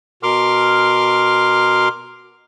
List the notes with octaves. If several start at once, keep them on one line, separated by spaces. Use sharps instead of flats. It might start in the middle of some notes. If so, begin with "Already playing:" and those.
B2 A#4 C6 D6 F6